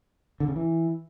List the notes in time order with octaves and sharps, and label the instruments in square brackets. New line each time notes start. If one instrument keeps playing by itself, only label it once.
[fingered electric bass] D3
C#3
E3